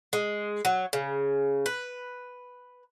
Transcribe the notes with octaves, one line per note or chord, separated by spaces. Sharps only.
G#3
F#3
C#3
B4